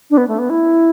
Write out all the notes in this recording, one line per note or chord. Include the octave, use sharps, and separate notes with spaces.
D4
B3
A3
B3
E4